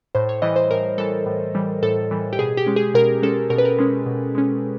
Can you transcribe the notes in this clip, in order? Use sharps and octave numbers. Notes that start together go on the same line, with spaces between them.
A2 C5
C#5
E3 G3 D#5
C5
A2 A#4
E3 G3 A4
A2
E3 G3
A2 A4
E3 G3
G4
B2 G#4
G4
G#3 C#4
G#4
B2 A#4
G#3 C#4 A4
B2 A#4
B4
A#4
G#3 C#4
B2
G#3 C#4